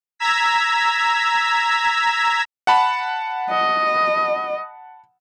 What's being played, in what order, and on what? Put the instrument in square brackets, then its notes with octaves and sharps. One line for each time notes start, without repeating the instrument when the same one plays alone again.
[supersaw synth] A#5 E6 G#6 B6
[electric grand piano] F#5 A5 B5
[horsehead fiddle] D#5